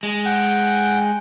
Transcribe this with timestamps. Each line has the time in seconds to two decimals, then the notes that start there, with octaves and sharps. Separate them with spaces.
0.03 G#3
0.25 F#5 G5